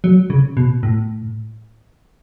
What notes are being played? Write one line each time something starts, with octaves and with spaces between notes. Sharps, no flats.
F#3
C#3
B2
A2